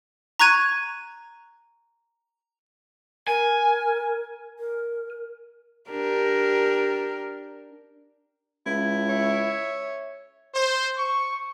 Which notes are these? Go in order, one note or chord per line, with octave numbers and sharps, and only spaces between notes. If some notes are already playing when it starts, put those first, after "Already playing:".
A#5 C#6 F#6 G#6 D#7
A#4 G#5
A#4
D4 G4 A#4
C#2 E4
C#5 E5
C5
C#6